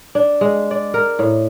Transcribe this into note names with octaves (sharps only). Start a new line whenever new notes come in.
D4
G#3
D5
A#4
A2